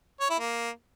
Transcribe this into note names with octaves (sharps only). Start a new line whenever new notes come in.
C#5
E4
A#3